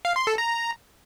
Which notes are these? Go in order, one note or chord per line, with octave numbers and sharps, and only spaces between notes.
F5
C6
A4
A#5